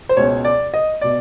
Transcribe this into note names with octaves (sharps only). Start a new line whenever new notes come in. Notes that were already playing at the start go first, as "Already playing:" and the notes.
C5
C#2 B2 C#5
D5
D#5
B2 D5